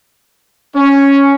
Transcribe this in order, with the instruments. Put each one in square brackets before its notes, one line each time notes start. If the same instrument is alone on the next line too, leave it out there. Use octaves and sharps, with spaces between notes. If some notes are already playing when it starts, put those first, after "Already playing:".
[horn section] C#4